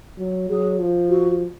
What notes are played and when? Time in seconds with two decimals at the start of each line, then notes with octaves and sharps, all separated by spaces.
0.18 F#3
0.49 F#3 G#4
0.80 F3
1.09 F#4